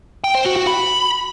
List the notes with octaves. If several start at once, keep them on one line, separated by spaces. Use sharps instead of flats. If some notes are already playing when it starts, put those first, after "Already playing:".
G5
C5
F#4
F#4
B5